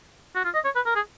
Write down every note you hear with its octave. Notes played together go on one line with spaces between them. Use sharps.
F#4
F4
D#5
C#5
B4
A#4
G#4